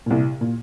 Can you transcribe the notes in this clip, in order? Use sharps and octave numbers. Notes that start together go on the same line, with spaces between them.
C2 A#2
A#2